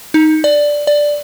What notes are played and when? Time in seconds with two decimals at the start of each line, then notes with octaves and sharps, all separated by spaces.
0.14 D#4
0.44 D5
0.87 D5